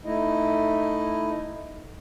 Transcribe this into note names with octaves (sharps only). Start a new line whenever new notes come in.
A3 D#4 E4 D#5